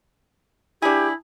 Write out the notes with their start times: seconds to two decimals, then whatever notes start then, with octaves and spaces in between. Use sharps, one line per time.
0.82 D4 E4 G4 G#4